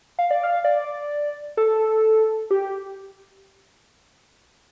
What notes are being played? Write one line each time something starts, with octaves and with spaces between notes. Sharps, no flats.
F5
D5
F5
D5
A4
G4